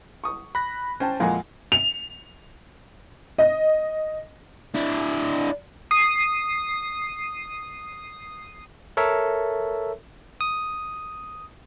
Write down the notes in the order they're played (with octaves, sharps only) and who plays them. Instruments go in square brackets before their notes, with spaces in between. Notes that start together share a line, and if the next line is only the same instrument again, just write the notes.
[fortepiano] C#6 D#6
[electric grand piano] B5 F#6 A#6
[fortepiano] C#4 [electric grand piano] C5 G5 A5
[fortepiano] F2 A#2 G#3 [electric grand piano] F5 F#5 G#5
[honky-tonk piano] F7
D#5
[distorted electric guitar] D4 E4
[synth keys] D#6 C7
[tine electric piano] A4 A#4 C#5 E5
D#6